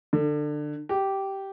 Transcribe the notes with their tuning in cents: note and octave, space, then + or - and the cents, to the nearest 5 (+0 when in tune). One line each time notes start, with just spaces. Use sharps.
D3 +20
G4 -10